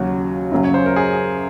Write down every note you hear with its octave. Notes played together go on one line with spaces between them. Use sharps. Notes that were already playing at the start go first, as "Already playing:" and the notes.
Already playing: D#2 C#3 F#3 F#4
F#2 C#3 F#3
C#5
C5
A#4
G#4